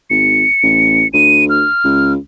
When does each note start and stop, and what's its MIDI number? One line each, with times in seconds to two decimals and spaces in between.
0.10 0.44 32
0.10 1.08 97
0.63 1.04 33
1.13 1.66 38
1.13 1.45 99
1.50 2.12 89
1.84 2.16 37